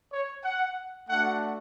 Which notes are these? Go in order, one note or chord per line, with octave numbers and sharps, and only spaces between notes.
C#5
F#5
A3 D4 F#4 F#5